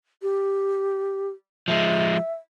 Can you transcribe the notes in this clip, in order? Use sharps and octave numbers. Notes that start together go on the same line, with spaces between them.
G4
F3 G#3 E5